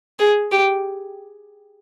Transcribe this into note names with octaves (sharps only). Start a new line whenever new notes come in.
G#4
G4